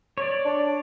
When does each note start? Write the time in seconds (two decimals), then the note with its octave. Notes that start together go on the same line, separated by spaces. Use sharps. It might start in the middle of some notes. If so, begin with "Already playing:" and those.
0.18 C#5 D5
0.45 D4